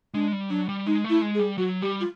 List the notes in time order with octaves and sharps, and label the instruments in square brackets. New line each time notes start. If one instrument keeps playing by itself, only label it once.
[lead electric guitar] G#3 [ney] D4
[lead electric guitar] G3
[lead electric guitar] F#3 [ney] D4
[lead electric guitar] G3
[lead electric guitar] G#3 [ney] D#4
[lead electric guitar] A3
[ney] E4
[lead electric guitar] G#3
[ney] G#4
[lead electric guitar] G3
[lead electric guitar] F#3 [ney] F#4
[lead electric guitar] G3 [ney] G4
[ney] F4